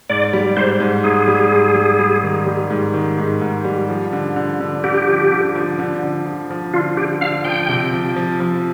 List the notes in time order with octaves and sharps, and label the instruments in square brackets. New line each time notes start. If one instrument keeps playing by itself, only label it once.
[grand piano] G#2 [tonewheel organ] D5
[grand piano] G3
[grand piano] G#2 [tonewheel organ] C5
[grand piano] G#2
[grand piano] G#2 [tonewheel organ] G#4
[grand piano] G3
G#2
G3
G3
D#3
G3
G#2
D#3
G#2
G#2
G3
F3
D3
D3
D3
[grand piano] D3 [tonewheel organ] G4
[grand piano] F3
D3
F3
D3
D3
F3
F3
[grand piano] D3 [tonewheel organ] F4
[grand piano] D3 [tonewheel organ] G4
[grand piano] D3 [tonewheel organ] F5
[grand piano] F3 [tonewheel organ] G5
[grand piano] C3
F3
F3
F3